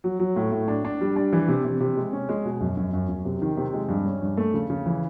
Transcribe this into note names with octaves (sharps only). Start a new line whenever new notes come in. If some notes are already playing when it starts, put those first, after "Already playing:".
F#3
F#3
A2
A2
D4
D4
G3
D4
E3
C3
C3
C3
G#3
C#4
G#3
B2
F#2
F#2
F#2
F#2
C3
D#3
C3
G#3
G2
C#4
G2
A3
C#3
C#3
E3